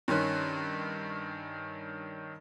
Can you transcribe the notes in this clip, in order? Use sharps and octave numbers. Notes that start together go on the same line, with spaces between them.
G2 D#3 C#4 C6 F#6